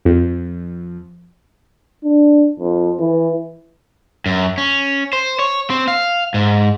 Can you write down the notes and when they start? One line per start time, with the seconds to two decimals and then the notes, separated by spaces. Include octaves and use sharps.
0.05 F2
2.04 D4
2.59 F2
3.00 E3
4.26 F#2
4.58 C#4
5.13 C5
5.39 C#5
5.70 C4
5.88 F5
6.34 G#2